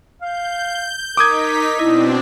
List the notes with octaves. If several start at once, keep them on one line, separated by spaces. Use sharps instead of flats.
F5 G6
D#4 A#4 D6 D#6 G#6 B6
B2 C4 D4 E4 D#5